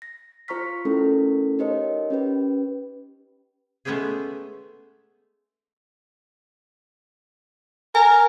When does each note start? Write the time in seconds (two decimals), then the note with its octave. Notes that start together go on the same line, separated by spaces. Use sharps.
0.02 A#6
0.48 F4 C5 A#5 C#6 F6 B6
0.85 A3 C#4 E4 A4 A#4
1.59 D#4 G4 A#4 C5 C#5 D#5
2.10 C#4 G4 B4
3.85 G#3 A3 B3 C#4 G4 G#4
7.95 A#4 G#5